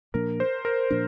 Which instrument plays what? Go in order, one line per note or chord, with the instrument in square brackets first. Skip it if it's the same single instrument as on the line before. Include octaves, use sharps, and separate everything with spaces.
[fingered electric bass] A#2 F3 A#3 D4 [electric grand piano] A#4
[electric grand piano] C5
A#4
[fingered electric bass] A#2 F3 A#3 D4